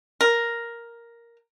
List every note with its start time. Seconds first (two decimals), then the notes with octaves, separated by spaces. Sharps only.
0.21 A#4